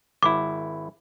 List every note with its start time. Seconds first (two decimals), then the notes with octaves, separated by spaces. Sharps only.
0.23 G#1 E4 D6